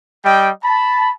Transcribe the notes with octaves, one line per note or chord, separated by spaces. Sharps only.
G3 D#5 G5
A5 B5